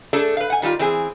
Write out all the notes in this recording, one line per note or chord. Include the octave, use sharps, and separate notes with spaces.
A3 D4 G#4 A4
B4 F5
F#5 G#5
D#3 G3 A3 F4
E3 C4 G#4